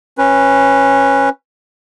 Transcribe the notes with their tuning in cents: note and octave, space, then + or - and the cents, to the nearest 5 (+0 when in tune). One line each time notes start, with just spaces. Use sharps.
C#4 -15 B4 +0